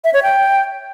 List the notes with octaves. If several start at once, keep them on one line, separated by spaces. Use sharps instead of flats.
E5
C#5
G5